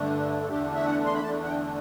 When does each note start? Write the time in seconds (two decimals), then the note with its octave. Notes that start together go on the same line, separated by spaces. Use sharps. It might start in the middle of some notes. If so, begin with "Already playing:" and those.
Already playing: G2 D3 A3 D4
0.42 A4
0.49 E2 D3 A3 D4 G4
0.75 E5
0.86 F#5
1.05 C6
1.14 B5
1.23 E2 D3 A3 D4 A5
1.43 F#5
1.47 G5